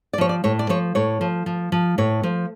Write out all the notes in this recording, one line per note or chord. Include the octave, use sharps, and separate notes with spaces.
D5
F3 C#5
D5
A2 C#5
D5
F3 C#5
A2 C#5
F3
F3
F3
A2 C#5
F3